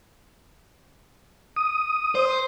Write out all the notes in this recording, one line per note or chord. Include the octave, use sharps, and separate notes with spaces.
D#6
C5